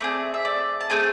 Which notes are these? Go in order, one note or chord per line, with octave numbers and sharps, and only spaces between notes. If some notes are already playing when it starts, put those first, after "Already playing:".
A3 C4 G#4 D5
E5
D5
A5
A3 C4 G#4 G#5